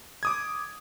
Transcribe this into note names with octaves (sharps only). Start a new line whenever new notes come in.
D6 D#6 G#6